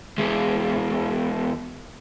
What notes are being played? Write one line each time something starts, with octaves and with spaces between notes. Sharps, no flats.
E2 G#3